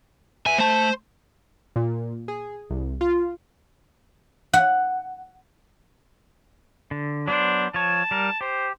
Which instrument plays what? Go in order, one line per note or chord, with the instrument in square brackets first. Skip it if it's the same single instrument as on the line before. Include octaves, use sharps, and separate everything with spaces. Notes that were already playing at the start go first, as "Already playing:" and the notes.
[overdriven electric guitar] B3 E5 [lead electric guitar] G#5
[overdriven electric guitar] A3 A5 [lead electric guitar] C5
[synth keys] A#2
G#4
C2
F4
[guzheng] F#5
[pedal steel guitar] D3
[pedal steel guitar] F#3 B3 C5 [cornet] D4
[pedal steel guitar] F3 C#5 [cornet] A5
[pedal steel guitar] G3 A#4
[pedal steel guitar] G4 [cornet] C5